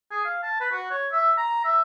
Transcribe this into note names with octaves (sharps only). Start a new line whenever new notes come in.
G#4
F5
A5
B4
F#4
C#5
E5
A#5
E5